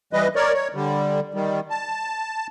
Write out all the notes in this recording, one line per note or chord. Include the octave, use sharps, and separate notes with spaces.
E3 G3 B4 D#5
A#4 C#5 D5
C#5
D3 G3
D#3 G3
A5